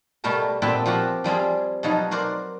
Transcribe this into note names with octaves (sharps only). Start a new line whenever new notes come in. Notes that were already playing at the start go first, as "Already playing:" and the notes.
B2 G3 A3 A#4 A5
A#2 B3 C4 E5 G5 A5
F3 C4 F#4 G4
F3 G3 C4 G#4
B2 F3 F#3 D#4
F#4 A#4 C5 D5